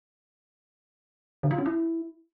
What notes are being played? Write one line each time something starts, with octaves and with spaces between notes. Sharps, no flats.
D3
F4
C#4
E4